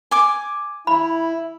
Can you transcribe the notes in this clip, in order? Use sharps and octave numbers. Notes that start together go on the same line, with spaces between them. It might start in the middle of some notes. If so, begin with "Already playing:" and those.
G#5 D6
E4 B5